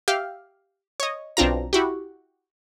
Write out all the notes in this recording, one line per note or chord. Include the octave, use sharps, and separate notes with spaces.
G4 E5 F5 G5
C#5 D#5
B1 C4 D4 F4 A#5
E4 F#4 G4